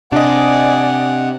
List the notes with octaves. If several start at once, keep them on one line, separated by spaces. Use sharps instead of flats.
C3 D4 D5 D#5 F#5 G#5